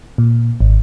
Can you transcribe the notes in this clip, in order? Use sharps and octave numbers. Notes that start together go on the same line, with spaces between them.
A#2
G#1